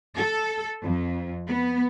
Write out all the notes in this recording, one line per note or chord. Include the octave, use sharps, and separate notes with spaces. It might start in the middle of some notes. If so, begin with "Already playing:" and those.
A4
F2
B3